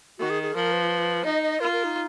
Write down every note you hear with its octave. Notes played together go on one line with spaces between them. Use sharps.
D#3 F#4
G#4
G#4
F3 A#4
B4
D#4 D#5
D#5
F4 A#4
A#4
D#4